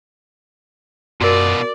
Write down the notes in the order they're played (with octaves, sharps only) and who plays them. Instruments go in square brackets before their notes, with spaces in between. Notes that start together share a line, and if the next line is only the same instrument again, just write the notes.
[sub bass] F#2 [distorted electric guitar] B2 F4 [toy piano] F#4 A#4 [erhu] D5